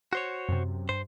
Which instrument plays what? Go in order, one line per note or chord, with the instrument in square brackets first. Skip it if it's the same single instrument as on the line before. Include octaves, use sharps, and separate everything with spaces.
[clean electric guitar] F#4 C5 C#5
[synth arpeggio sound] F#2 C3
[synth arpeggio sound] G2 [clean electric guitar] C5